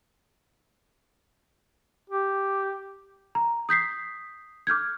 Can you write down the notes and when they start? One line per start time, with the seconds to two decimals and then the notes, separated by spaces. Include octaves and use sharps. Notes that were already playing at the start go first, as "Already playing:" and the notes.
2.10 G4
3.35 A#5
3.69 D#6 G6 B6 C7
4.67 D6 F6 G6 G#6